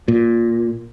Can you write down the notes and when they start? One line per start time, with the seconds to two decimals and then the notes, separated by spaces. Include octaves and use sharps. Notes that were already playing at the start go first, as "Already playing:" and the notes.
0.08 A#2